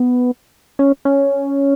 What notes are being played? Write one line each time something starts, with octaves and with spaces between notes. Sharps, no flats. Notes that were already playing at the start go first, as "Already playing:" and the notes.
Already playing: B3
C#4
C#4